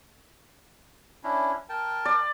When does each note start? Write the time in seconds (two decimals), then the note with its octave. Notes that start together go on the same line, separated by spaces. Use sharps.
1.24 C#4 D4 E4
1.69 A#4 G5 A5
2.05 D5